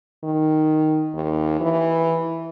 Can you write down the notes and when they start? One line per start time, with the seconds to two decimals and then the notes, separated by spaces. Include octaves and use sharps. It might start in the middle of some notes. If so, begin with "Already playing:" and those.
0.24 D#3
1.14 D#2
1.61 E3